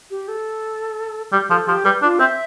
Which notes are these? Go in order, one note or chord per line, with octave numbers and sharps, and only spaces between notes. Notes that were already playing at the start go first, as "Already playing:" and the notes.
G4
A4
G3 G4
F3 A4
F3 G4
G3 B4
D4 F4
C4 E5